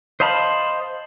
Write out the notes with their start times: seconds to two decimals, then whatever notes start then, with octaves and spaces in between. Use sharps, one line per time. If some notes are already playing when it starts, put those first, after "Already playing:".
0.20 C5 D#5 F5 A5 B5